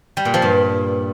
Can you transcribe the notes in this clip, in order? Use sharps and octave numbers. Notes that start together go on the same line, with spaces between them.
G3
A#2
F3
G2